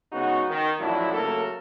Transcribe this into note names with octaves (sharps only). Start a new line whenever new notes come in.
C#3 G#3 B3 D#4 F#4
D#3
A1 F2 F#3 D4 E4
C#3 F#3 A3 A#3 A4 A#4